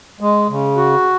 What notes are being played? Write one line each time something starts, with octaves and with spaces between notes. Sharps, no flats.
G#3
C#3
F#4